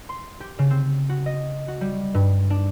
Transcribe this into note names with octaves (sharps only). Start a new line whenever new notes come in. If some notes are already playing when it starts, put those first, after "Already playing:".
C6
G4
C#3
C4
F#4
D#5
F#4
G3
G2
D4